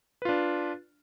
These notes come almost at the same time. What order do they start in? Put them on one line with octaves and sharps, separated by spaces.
B4 F4 D4